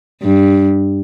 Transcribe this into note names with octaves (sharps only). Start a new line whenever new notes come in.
G2